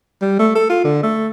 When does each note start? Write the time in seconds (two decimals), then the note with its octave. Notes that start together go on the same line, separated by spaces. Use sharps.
0.21 G3
0.39 A3
0.55 A4
0.70 F4
0.84 D3
1.03 A3